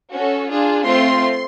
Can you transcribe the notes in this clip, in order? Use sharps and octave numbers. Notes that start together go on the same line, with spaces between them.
C#4 F#4 A4
D4 F4 G#4
A3 C4 F4 C6